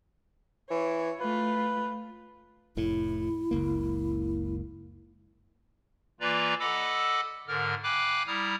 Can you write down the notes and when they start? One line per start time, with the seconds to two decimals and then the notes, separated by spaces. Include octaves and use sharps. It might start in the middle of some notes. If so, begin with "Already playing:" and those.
0.70 E3 C#5
1.20 A3 F4 B4
2.77 F1 A2 E4
3.51 F#1 C#2 A#3
6.20 E3 A#3 F4 B4 D5 A#5
6.60 A4 D#5 F#5 B5 D6 E6
7.48 G#2 D3 A#4 F6
7.83 F5 G5 G#5 B5 D6 F#6
8.27 G3 E4 A#5 D#6 F6